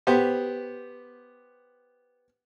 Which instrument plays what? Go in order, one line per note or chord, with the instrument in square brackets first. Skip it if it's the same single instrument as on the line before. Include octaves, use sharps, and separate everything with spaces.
[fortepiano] B3 G4 C5